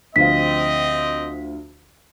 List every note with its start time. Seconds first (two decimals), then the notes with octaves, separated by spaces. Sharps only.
0.16 D2 F3 C4 D#5 F5 B6